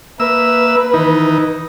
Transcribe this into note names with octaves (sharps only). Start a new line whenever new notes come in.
A#3 B4 E5 E6
D#3 E3 D#4